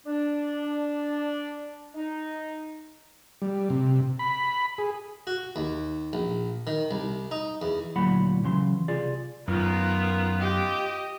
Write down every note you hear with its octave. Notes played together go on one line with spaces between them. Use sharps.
D4
D#4
G3
C3
B5
G#4
F#4
D#2
A#1
D#3
C2
D#4
E2
D2 A#2 F#3 E4 F#5 B5
C#2 C#3 E3 F#3 C6
C2 F4 G#4 D5
F#2 D#3 B3 F4 A#4
G4 D#5